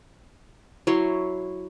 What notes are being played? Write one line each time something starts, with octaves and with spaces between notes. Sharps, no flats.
F#3 E4 C#5 C6